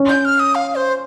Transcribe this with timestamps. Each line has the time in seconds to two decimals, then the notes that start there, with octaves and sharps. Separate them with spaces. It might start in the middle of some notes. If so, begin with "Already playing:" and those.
Already playing: C#4
0.09 G6
0.25 F6
0.40 D#6
0.55 F5
0.75 C5